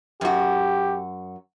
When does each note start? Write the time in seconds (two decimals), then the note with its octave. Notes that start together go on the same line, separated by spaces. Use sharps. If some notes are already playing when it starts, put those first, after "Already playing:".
0.21 F#2 F#4 G4